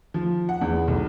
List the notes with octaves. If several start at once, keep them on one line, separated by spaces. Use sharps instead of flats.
F3
F#5
E2
B1